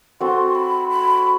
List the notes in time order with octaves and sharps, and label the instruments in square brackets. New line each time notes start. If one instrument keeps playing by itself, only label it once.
[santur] C4 F#4 A4 [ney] C6
[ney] B5
B5